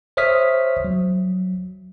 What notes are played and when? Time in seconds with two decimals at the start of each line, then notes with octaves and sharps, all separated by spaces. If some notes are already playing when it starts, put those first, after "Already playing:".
0.17 C5 C#5 E5 D#6 F6 B6
0.85 F#3